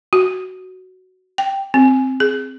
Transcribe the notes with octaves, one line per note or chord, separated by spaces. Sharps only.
F#4
G5
C4
G#4